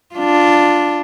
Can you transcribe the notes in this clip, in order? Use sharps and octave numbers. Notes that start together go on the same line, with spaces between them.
D4 F4